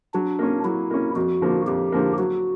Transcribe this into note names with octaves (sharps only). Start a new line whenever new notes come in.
F#3 D4
A#3 C#4
F#3 E4
A#3 C#4
F2 F#4
D3 F3 A#3
F2 G4
D3 F3 A#3
F#3 F#4